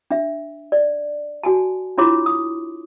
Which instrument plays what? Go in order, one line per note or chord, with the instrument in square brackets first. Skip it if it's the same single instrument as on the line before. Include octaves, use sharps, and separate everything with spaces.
[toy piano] D4 E5
D5
F#4 G#5 A5
D4 E4 F4 C#5 C6 D6
D#6